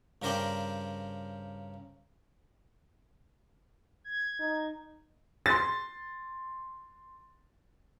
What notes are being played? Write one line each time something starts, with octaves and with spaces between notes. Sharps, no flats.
G2 C#3 A#4 C5 D5 G5
G#6
D#4
C6 A6